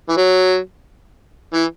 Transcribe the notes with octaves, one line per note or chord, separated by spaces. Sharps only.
E3
F#3
E3